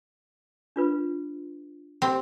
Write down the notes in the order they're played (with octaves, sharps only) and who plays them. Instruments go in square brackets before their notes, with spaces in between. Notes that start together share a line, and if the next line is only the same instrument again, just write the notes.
[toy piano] D4 F4 B4
[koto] C4 [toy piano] G4 F#5